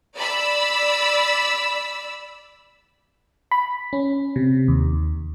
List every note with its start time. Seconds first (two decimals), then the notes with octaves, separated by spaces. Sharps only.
0.15 D5 B5 E6
3.52 B5
3.93 C#4
4.36 C3
4.68 D#2